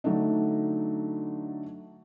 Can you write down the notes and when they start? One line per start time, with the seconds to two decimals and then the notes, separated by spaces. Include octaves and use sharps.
0.04 D3 F#3 A3 D4 D#4